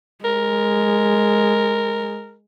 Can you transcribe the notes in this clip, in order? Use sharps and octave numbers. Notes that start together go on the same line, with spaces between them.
G#3 A#4